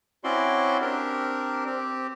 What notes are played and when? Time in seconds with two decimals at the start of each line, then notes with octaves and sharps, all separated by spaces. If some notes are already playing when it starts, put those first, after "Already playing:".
0.24 C4 C#4 E4 F#4 D5 C6
0.82 C4 D4 G4 A#4
1.66 C4 G4